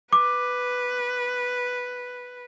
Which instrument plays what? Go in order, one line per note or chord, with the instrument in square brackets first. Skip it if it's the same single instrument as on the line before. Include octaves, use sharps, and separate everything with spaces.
[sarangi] B4 [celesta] D6